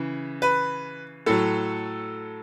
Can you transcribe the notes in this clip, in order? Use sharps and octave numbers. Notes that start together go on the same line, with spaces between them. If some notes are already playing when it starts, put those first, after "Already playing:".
Already playing: C#3 E3
B4
A2 F#3 A4